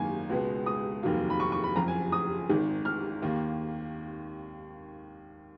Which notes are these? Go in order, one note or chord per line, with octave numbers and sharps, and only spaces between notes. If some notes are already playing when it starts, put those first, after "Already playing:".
Already playing: G#1 F#2 D#3 A#3 G#5
C#2 B2 G#3 B3
D#6
F1 D#2 D#3 F#3 A#3
B5
C#6
C#6
B5
F#1 F2 F3 A#5
G#5
D#6
G#1 G#2 D#3
F6
D#2 D#3 A#3